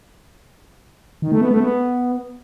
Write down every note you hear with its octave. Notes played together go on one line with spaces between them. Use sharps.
D#3
A3
B3
A3
B3